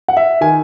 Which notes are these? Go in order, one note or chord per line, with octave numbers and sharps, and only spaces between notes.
F#5
E5
D#3 G#5